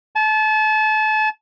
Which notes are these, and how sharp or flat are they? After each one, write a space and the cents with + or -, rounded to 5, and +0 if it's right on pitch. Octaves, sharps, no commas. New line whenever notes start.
A5 -30